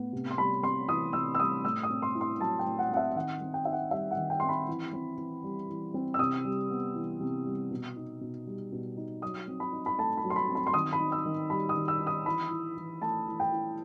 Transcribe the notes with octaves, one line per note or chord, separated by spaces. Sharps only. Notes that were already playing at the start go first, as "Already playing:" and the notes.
Already playing: A2 B3
C3
C6
G3 B5
C4 C6
E3 D#6
C3 E6
E6
G3 D#6
A2 E6
D#6
C4
C6
E4
C6
F#3 A5
G5
A2
F#5
C4 F#5
E5
D#3 F#5
C4
G5
D#4 E5
F#5
G3 E5
F#5
D#3
G5
C4 C6
B5
E3
C4
E3
G3
E3
C4
E6
C3 D#6
G3
B3
E3
C3
G3
B2
D#4
B2
G3
B2
D#4
F#3 D#6
C4
B5
D#4
B5
A3 A5
B5
F#3
C6
B5
C4
B5
C6
D#3 D#6
B5
D#4
E6
D#3
G3 B5
D#6
D#3
E6
D#4
D#6
E3 B5
E4
E3
A3 A5
E3
G5
E4